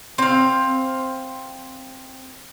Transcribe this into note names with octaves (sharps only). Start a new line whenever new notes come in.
C4 F5